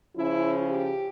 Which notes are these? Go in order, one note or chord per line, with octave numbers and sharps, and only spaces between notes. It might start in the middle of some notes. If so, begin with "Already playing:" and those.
C#3 F3 C#4 E4
G4